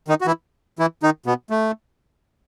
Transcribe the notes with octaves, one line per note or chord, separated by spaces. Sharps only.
D#3 D#4
F#4
E3 E4
E3 E4
D#3 D#4
B2 B3
A3